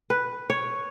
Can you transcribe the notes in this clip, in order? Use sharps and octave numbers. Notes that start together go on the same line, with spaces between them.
B4
C#5